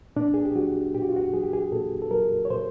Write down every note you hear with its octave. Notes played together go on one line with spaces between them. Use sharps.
A#2 D4
G#4
G4
F#3 F#4
A#2 G4
F#4
F4
F#4
F#3 G#4
G4
G#4
A#2 A4
A4
F#3 A#4
C#5
A#2 C5